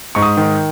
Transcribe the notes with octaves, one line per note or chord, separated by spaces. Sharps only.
G#2 C#6
D#6
D#3